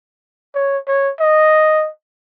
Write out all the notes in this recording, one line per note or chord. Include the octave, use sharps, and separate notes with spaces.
C#5
C#5
D#5